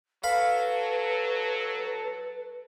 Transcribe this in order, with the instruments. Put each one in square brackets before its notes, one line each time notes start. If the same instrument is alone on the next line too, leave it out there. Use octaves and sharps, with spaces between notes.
[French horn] F#3 [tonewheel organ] A4 [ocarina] B4 [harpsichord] F5 B5